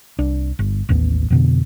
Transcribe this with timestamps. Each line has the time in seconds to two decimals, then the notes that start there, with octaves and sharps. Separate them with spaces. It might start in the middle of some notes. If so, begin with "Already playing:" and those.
0.19 C2 D4
0.59 G1
0.89 A1 D#2 B3
1.30 F2 B2 D3